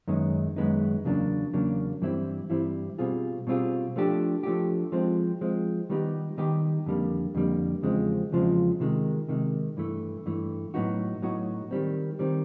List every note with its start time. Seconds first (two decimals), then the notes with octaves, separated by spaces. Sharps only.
0.08 F#2 D#3 G#3 B3 D#4
0.56 F#2 D#3 G#3 B3 D#4
1.05 E2 C#3 F#3 A#3 D4
1.53 E2 C#3 F#3 A#3 D4
2.02 G2 E3 G3 C4 E4
2.50 G2 E3 G3 C4 E4
2.99 B2 G3 C4 F4 G#4
3.47 B2 G3 C4 F4 G#4
3.96 F3 A3 D4 G4
4.43 F3 A3 D4 G4
4.92 F3 G#3 C4
5.41 F3 G#3 C4
5.90 D#3 G3 B3 D#4 G4
6.38 D#3 G3 B3 D#4 G4
6.86 F2 D3 G3 A#3
7.35 F2 D3 G3 A#3
7.83 E2 C#3 F3 G#3 C4
8.32 E2 C#3 F3 G#3 C4
8.80 C3 D#3 G#3
9.29 C3 D#3 G#3
9.77 G2 E3 A3
10.26 G2 E3 A3
10.74 A2 F#3 B3 D#4 F#4
11.22 A2 F#3 B3 D#4 F#4
11.71 D#3 G3 C4
12.19 D#3 G3 C4